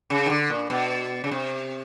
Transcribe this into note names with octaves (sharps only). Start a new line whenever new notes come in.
C#3
D#3
D3
A#2
B2
C#3
C3